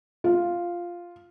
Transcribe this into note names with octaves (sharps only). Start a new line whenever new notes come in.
F4